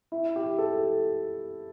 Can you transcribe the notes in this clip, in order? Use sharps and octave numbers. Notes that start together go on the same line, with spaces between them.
E4
G4
A4